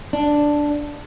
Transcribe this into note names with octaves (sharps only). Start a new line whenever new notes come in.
D4